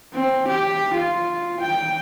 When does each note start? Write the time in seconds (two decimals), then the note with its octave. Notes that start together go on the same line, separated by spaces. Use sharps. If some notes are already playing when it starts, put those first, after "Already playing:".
0.13 C4
0.47 G4
0.94 F4
1.60 G5